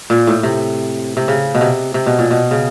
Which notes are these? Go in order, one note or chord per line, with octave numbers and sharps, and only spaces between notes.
A#2
A2
C3
C3
C#3
B2
C3
C3
B2
A#2
B2
C#3